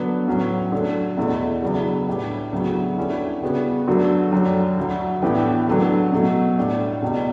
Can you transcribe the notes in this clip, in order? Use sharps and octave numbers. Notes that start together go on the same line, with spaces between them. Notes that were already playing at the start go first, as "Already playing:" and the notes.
Already playing: D3 F#3 B3
A2 F#3 C#4
D3 F#3 A3
E2 B2 A3 E4 A4
C#2 C#3 F#3 B3 D4
A2 G3 D4 G4
D2 C#3 F#3 B3
D3 G3 C#4 E4
C#3 G3 B3 F#4
D3 F#3 A3 D4 F#4
F#2 D3 G3
D2 D3 F#3
A2 E3 B3 D4 G4
D3 F#3 A3 D4
B2 F#3 A3
A2 G3 D4
C#2 B2 G3